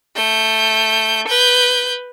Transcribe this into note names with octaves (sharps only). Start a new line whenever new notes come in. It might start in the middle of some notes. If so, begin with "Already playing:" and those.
A3 G6
B4 G6